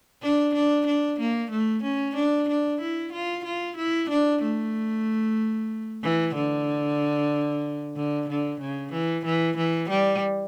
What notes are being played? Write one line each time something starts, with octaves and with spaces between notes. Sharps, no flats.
D4
D4
D4
A#3
A3
C#4
D4
D4
E4
F4
F4
E4
D4
A3
E3
D3
D3
D3
C#3
E3
E3
E3
G3